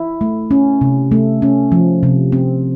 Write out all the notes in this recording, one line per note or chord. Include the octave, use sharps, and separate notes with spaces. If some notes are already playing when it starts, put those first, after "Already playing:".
Already playing: E4
A3
C#4
C3
A3
C#4
F3
C3
C4